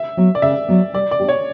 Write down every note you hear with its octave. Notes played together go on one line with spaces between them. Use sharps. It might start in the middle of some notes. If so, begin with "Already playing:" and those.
Already playing: E5
F#3 B3
D5
C#3 E5
F#3 B3
G3 D5
D5
B3 D4 G4
C#5